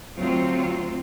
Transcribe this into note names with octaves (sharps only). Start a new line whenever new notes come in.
D2 F#3 C4 F4